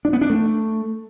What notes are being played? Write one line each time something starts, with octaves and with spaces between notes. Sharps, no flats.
D4
B3
D4
A3